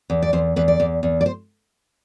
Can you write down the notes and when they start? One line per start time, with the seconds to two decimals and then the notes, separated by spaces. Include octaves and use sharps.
0.10 E2
0.22 D5
0.33 E2 C5
0.56 E2 B4
0.68 D5
0.80 E2
1.03 E2
1.21 D5
1.26 C5